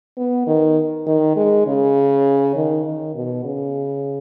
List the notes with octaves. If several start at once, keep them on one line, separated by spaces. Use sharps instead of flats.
B3
D#3
D#3
G#3
C#3
D#3
D#3
B2
C#3